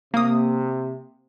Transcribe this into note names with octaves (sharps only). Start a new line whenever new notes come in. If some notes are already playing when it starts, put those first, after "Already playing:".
C3 A#3 D#6